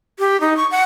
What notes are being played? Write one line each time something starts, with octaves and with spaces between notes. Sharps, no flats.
G4
D#4
C#6
F#5